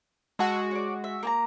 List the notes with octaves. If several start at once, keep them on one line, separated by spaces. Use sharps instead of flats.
G#3 F#4 F#5 A5 E6
C#5 D5
E5
A#3 G5 A#5